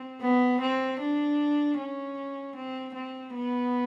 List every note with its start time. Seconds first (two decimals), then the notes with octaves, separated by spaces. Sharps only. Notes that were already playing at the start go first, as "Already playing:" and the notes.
Already playing: C4
0.21 B3
0.61 C4
1.00 D4
1.78 C#4
2.56 C4
2.94 C4
3.33 B3